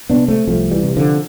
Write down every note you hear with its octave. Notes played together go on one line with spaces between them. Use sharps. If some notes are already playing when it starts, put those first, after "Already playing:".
C3 B3 D4
A3 C4
C2 F3 A3
E3 G3
C3
D3 F3